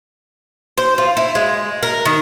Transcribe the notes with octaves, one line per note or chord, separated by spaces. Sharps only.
C5
F4
E4
G#3
A#4
D#3